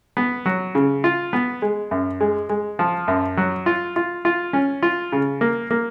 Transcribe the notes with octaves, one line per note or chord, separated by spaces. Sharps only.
B3
F#3
C#3
F4
B3
G#3
F#2
G#3
G#3
F3
F#2
F#3
F4
F4
F4
C#4
F4
C#3
A#3
A#3